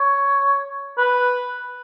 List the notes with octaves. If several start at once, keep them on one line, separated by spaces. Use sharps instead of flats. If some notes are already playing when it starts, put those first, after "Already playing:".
Already playing: C#5
B4